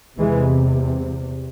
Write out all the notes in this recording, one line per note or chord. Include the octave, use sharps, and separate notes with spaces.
E2 C3 E3 G#3